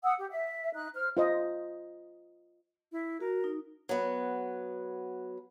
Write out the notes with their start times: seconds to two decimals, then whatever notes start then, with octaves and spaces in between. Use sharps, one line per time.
0.04 F#5 D#6 E6
0.19 G4
0.30 E5
0.73 D#4 F#6
0.95 C5 F6
1.17 F4 C5 D#5
2.92 E4
3.21 F#4 A#4
3.44 D#4
3.89 F#3 B3